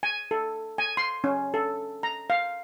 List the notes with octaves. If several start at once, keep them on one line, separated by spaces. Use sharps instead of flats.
G#5
A4
G#5
C6
C#4
A4
A#5
F5